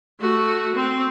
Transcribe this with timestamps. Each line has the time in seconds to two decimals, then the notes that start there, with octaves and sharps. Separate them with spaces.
0.20 A3 F#4
0.75 C4